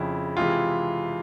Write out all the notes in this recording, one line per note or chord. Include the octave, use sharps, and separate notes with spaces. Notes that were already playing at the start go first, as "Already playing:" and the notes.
Already playing: F2 C#3 F3 E4
C3 E3 G#3 F4